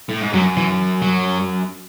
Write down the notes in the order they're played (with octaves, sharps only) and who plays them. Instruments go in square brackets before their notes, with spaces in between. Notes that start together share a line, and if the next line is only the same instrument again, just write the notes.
[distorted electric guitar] A2
G#2
[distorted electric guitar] F#2 [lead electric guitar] F#3
[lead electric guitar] E3
F#3